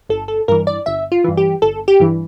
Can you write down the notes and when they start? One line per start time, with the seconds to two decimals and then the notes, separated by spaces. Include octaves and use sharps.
0.09 G1 A4
0.28 A4
0.48 G2 E3 A#4
0.67 D5
0.86 G1 E5
1.12 F4
1.24 G2 E3
1.37 G4
1.62 G1 A4
1.88 G4
2.00 G2 E3